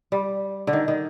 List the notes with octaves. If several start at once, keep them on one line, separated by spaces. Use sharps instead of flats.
G3
D3
D#3
D#3